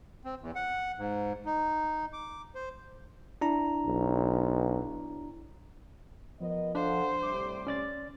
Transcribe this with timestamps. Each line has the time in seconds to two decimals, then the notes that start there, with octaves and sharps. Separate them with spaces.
0.24 C4
0.41 E2
0.55 F#5
0.98 G#2
1.46 D#4
2.13 D6
2.55 C5
3.41 D4 E4 A#5
3.87 B1
6.40 F3 B3 A#4 D#5
6.75 D4 A4 C5 F5 F#5
7.22 A2 C3 G3 D6
7.67 C#4 D5 A6